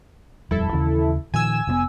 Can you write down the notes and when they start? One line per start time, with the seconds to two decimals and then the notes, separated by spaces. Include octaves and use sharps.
0.51 D#1 F2 G3 E4 A4
0.73 D#2 C#3 E3
1.34 A#2 D#3 F3 G#5 E6
1.67 F1 A2 B3